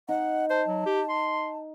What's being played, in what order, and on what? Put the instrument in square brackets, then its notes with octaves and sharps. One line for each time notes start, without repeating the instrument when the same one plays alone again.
[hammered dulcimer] D#4 [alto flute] F#5
[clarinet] C5 [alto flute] A5
[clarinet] F#3
G4
C6